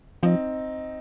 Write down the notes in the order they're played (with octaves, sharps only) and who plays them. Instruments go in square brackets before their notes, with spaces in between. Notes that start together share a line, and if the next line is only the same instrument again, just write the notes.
[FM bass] F3 [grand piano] C4 D#4